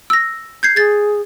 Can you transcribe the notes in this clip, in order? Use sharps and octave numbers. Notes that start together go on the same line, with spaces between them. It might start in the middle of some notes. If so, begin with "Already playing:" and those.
E6 A#6
G6 G#6 C7
G#4 G#6 A6